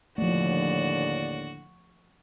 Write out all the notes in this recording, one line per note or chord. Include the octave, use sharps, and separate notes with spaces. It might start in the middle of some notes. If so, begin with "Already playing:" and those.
D#2 A2 D3 F3 A3 F#4 D5